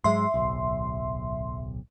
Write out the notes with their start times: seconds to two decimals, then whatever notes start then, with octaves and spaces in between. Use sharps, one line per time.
0.04 G#2 F#3 G#3 E5 C6
0.34 D1 B1